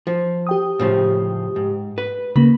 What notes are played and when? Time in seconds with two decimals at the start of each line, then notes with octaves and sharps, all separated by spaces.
0.07 F3
0.47 G4 G5 D#6
0.80 A2 C#3 F3
1.56 G#2
1.98 B4
2.36 C#3 A#3 B5